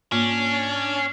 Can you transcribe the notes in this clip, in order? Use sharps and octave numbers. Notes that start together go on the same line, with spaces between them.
G#2 A#3 C#4 D4